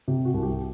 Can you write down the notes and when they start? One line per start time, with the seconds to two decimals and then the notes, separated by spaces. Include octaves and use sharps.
0.08 C3 G4
0.25 F#4
0.34 C2
0.43 G4